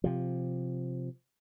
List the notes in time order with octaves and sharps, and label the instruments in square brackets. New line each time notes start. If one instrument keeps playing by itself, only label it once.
[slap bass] C3 F3